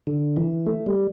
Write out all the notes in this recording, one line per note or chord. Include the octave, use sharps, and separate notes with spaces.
D3
E3
A3
G3